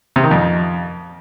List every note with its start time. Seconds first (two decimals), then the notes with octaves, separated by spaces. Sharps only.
0.16 C3
0.23 D#3
0.31 F2